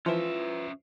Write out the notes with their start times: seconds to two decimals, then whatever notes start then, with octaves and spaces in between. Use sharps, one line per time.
0.06 E3 F3 C#4 F4 B4 E5